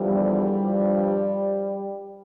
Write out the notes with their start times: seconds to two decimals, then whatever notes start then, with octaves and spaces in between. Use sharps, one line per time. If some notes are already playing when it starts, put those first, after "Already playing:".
Already playing: E2 D3 F3 G3
0.60 G2 F3